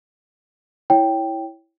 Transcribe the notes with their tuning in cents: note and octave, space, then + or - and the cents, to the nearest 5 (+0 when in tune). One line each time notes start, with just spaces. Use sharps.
E4 +0 C#5 +0 G5 +0